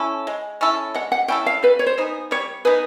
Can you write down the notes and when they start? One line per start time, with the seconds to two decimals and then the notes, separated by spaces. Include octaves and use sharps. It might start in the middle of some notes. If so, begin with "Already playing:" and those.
Already playing: C#4 E4 A4
0.27 G#3
0.61 C#4 E4 A4
0.94 G#3 F#5
1.12 F#5
1.28 C#4 E4 A4 G5
1.46 F5
1.63 G3 B4
1.79 C#5
1.86 C5
1.98 B3 D#4 G#4
2.31 G3 C#5
2.65 B3 D#4 G#4 B4